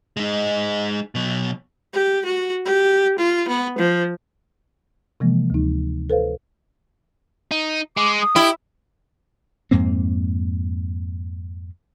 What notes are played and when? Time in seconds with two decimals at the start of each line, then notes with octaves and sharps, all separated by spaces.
0.17 G#3 D#4
1.15 B2 F#3
1.94 G4
2.25 F#4
2.66 G4
3.18 F4
3.48 B3
3.78 F3
5.20 C3 E3 F3 G#3 A#3
5.50 D2 D#4
6.10 A4 B4 C5 F5
7.51 D#4
7.97 G#3 D6
8.21 D#6
8.36 E4 G4
9.71 F2 G#2 A#3 C4